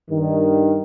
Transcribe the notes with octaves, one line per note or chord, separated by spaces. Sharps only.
G2 D#3